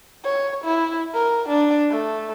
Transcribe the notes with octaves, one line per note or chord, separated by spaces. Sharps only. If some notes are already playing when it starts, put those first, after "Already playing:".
C#5
E4
A#4
D4
A3